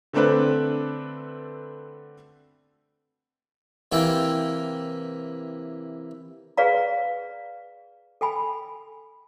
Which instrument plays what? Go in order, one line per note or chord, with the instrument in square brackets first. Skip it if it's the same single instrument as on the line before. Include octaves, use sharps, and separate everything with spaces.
[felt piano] D3 A3 C4 D4 A4 B4
[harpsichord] C3 E3 A#3 E4 G5
[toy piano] G#4 B4 D5 F5 A#5
A4 G5 G#5 B5